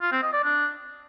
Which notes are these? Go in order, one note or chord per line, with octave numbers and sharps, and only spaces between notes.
F4
C4
D#5
D5
D4